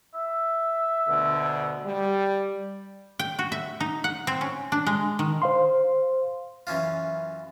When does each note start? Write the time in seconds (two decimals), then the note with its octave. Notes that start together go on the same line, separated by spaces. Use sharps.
0.15 E5
1.07 D2 B2 D3
1.85 G3
3.19 G5
3.39 F#4
3.52 E5
3.81 D#4
4.04 F#5
4.27 C4
4.41 C#4
4.72 D4
4.87 G#3
5.19 D#3
5.42 C5 F5 C6
6.67 F#2 E3 C#4 F4